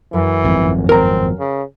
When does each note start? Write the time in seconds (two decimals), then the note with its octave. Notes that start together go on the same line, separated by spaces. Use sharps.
0.13 F#2 E3 F#3 B4
0.44 G#1 F2
0.89 C4 A#4 A#5
1.39 C#3